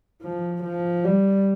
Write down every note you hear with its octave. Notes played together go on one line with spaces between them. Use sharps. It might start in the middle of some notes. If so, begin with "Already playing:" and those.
F3
F3
G3